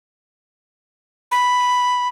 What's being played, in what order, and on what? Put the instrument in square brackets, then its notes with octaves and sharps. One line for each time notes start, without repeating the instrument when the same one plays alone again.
[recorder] B5